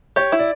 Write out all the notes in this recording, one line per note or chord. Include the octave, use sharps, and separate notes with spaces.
G4 C#5
E4
D5